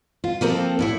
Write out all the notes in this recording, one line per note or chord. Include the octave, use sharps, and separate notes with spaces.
F4
F3 A#3 C4 A4
A2 E4 C#5